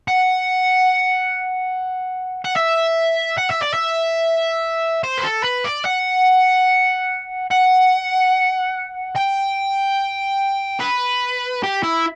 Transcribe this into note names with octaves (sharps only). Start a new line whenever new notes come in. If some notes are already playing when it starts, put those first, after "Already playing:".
F#5
F#5
E5
F#5
E5
D5
E5
C5
B4
A4
B4
D5
F#5
F#5
G5
B4
G4
E4